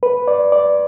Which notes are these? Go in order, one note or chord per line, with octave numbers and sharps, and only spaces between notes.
B4
D5
D5